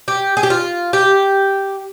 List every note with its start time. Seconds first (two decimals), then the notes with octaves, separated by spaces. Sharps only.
0.08 G4
0.37 G#4
0.43 G4
0.50 F4
0.93 G4